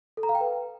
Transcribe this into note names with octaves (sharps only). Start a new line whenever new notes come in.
A4
A#5
F5
G5
B4